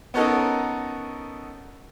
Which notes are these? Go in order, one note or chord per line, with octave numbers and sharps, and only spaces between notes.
B3 C#4 D#4 F#4 A4 A#4